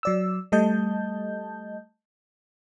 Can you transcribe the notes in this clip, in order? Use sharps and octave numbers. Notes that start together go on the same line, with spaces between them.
F#3 D5 E6
G3 A3 D#5 A5 G6